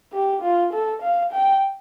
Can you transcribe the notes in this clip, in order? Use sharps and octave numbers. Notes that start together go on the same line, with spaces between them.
G4
F4
A4
F5
G5